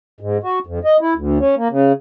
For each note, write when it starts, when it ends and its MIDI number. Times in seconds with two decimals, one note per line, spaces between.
0.20 0.38 44
0.43 0.59 66
0.67 0.79 41
0.84 0.97 75
1.01 1.14 64
1.15 1.39 38
1.39 1.55 61
1.57 1.68 58
1.70 1.92 49